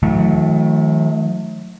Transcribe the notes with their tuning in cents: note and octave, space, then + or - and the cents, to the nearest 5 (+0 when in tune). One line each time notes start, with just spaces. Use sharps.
D#3 +35 F#3 -40 A3 -20